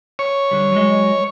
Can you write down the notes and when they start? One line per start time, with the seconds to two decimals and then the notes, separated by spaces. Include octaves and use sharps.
0.19 C#5
0.51 D3 G3
0.72 F#3 G#3 D#5